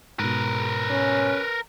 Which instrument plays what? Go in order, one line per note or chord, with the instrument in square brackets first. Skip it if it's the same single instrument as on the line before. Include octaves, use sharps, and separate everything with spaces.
[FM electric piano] G#2 B2 [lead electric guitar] A#4 B4
[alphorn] C#4